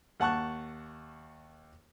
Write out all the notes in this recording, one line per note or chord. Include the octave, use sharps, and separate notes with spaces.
D#2 F#5 A5 C#6 F#6